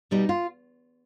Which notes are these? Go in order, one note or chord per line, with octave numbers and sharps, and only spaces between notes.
B2 G3 B3 D#4
F4